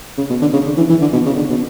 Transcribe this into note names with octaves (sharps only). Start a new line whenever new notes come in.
C#3
B2
D3
C#3
D3
E3
E3
D3
B2
C#3
D3
B2